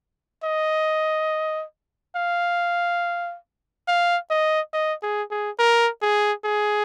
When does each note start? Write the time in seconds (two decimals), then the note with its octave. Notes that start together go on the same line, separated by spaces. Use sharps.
0.44 D#5
2.16 F5
3.88 F5
4.30 D#5
4.74 D#5
5.03 G#4
5.30 G#4
5.59 A#4
6.02 G#4
6.45 G#4